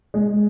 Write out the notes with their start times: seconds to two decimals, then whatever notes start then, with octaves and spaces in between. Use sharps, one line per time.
0.14 G#3